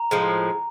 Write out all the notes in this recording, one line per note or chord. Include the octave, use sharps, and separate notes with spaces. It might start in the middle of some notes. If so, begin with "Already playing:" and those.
Already playing: A#5
A2 F3 G#3